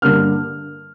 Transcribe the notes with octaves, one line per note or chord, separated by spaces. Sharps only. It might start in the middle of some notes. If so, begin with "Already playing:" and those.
G2 D3 A#3 F6